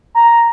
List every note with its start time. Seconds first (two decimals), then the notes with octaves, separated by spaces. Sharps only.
0.15 A#5